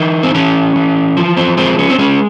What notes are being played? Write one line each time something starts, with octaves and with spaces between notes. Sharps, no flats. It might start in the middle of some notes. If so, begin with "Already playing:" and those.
Already playing: E3 D#4
C4
E3 C#4
E3
F3
C4
G#3 C4
C#4
C4
G#3 C#4